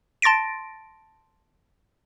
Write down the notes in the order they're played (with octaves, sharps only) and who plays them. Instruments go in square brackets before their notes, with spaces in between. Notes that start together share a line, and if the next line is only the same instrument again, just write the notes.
[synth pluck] A5 C6 A6 A#6 D7